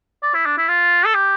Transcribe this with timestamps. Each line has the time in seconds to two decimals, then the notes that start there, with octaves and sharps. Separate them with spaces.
0.23 D5
0.34 E4
0.46 D4
0.58 E4
0.68 F4
1.06 A4
1.15 G4